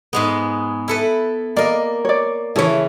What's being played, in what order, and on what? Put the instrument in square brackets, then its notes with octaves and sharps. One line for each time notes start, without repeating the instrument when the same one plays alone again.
[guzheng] G#2 G#3 B3
E4 A4 B4
[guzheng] A#3 A#4 [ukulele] D5 D#5
[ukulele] C#5 D5
[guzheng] C#3 E3 [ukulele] E4 A4 C#5